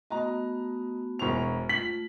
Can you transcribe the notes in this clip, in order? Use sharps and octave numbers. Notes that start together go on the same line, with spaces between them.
A3 B3 F#4 D#5 A#5
E1 C5 C#6 F7
A3 F4 B6 F#7